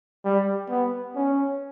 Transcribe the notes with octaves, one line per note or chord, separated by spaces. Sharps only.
G3
B3
C#4